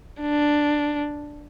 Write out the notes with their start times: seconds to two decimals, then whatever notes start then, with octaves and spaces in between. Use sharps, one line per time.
0.21 D4